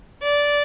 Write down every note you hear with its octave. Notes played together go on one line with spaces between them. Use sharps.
D5